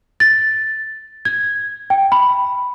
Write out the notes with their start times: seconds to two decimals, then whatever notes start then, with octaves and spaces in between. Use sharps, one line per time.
0.20 A6
1.25 G#6
1.90 G5
2.12 B5